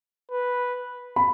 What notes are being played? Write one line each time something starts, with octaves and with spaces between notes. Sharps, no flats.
B4
B5